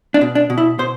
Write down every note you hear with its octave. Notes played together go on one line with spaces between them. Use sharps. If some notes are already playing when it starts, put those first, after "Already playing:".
D4
B2
D4
B2
E4
B2 C5